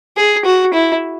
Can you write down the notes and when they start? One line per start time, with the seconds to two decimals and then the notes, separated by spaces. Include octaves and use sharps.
0.17 G#4
0.45 F#4
0.74 E4